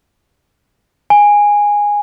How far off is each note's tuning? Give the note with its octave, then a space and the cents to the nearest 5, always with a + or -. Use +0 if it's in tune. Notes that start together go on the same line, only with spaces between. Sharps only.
G#5 -10